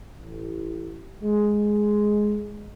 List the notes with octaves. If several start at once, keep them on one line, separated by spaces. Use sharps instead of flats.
A1
G#3